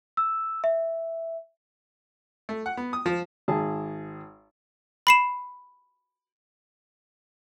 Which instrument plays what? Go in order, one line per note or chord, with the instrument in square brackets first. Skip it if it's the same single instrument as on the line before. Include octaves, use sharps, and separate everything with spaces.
[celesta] E6
E5
[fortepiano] A3
F#5
B3
D#6
F3
G#1 G#4 A5
[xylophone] B5 C7 E7